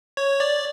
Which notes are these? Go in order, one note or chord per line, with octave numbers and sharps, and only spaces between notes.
C#5
D5